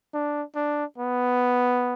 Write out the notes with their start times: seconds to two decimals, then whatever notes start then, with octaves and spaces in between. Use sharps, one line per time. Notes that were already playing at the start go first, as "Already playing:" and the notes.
0.14 D4
0.56 D4
0.98 B3